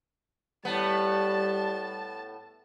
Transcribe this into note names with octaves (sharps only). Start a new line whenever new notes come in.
A2 G3 B3 A5